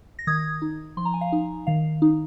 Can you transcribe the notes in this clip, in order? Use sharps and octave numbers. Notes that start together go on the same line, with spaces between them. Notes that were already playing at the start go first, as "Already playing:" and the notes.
A#6
D#3 D#6 G#6
D#4
F3 C6
A#5
G#5
F5 A#5
D#4
D#3 F5
D#4